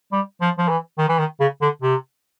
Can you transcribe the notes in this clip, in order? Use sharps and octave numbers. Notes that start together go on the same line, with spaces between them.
G3
F3
F3
E3
D#3
E3
D#3
C#3
D3
C3